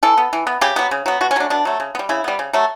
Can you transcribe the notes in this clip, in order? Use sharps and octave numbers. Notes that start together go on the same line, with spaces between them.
E3 A4
B3
E3
B3
C#3 G4
F#3 B3
C#3
F#3 B3
B2 F#4
C#4
F#3 A3 D4
B2 D4
F#3 A3
C#3
B3
G3
C#3 E4
G3 B3
C#3
F#3 A3